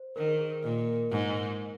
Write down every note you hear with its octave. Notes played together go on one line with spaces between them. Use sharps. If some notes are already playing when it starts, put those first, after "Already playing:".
Already playing: C5
D#3 A#4
G#4
G#4
A#4
A#2 A#4 D#5
G#2